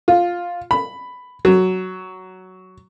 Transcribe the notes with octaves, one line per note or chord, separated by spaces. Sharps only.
F4
B5
F#3